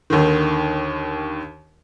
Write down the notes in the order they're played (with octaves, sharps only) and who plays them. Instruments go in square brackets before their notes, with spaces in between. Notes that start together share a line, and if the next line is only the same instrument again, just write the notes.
[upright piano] D#2 D3 D#3